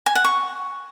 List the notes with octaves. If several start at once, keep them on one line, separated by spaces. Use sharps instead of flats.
G#5
F#5
C#6